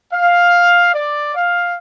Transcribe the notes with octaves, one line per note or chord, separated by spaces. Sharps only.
F5
D5
F5